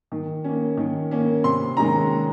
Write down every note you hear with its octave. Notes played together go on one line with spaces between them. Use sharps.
D#3
A#3 C#4
D#3
A#3 C#4
C3 C6
D#3 G#3 C#4 A#5